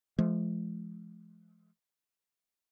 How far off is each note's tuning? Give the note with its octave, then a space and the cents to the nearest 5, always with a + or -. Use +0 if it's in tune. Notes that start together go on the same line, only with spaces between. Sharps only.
F3 -25 G#3 +45